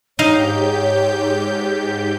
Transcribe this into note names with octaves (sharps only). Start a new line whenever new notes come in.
G#2 D#4 G4 C#5 D#5 F5 G6